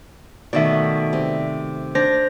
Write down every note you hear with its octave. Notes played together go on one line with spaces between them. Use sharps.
B2 D#3 A3 D5 E5
C3
D4 C5 A#6